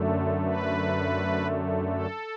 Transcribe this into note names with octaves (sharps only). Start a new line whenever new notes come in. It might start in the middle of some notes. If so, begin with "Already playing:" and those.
Already playing: F#2 D3 A3
B4
A4